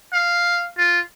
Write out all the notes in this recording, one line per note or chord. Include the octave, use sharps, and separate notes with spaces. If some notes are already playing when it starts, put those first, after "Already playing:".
F5
F4